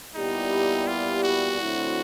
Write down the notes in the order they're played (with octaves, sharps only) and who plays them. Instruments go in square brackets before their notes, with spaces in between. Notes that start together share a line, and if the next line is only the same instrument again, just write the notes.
[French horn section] A#2 G3 B3 E4 G4 [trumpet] D#4
[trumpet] F4
F#4
[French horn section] D3 F#3 A3 C4 E4